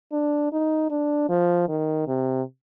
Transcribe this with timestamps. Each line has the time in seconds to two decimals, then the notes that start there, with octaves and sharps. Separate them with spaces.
0.12 D4
0.52 D#4
0.90 D4
1.29 F3
1.69 D#3
2.07 C3